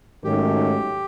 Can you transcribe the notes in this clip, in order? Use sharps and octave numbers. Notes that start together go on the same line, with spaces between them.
G#2 D#3 F#3 A3 C#4 G4